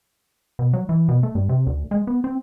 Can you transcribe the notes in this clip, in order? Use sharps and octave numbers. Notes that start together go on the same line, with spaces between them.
B2
F#3
E3
B2
A3
G2
C3
D2
G#3
B3
C4